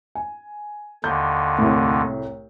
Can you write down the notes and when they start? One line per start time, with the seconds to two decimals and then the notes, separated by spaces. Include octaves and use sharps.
0.15 G#5
1.04 D#2 D3 G6
1.59 C2 A2